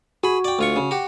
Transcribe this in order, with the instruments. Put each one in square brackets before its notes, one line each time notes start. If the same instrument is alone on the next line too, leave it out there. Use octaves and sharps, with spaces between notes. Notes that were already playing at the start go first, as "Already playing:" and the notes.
[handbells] F#4 [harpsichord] G#4 B5
[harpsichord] D5 G5
D2 F4 C#6
C#3
F#4 G4